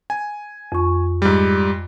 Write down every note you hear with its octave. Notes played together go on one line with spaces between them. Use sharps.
G#5
F2 C#6
G#2 G3